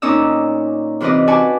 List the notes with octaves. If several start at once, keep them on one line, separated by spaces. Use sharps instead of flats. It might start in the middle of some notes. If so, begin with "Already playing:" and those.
A#2 C#4 D#4 D5 D#6 E6
C3 E3 F4 B4 D5 D#5
F#4 B4 D5 G#5 A5